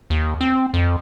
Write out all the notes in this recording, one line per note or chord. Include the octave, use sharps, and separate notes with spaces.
D#2
C4
F2